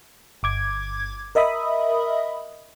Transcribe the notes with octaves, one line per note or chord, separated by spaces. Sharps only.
G1 D6 G#6
A#4 D#5 E5 B5 D#6